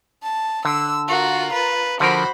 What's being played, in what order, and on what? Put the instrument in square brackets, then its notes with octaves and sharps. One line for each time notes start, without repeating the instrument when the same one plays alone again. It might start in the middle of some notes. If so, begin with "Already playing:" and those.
[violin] A5
[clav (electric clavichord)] D3 [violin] E6
[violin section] F4 A#4 A#5 [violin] F#4
[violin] B4
[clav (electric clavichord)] D3 F3 A#4 [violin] F#4 [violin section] C5 B5